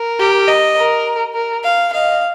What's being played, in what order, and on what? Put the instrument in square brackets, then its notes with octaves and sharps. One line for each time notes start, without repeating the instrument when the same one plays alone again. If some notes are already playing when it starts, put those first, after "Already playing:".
Already playing: [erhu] A#4
[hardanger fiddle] G4
D#5
[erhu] A#4
A#4
[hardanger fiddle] F5
[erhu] D#5 [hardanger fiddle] F5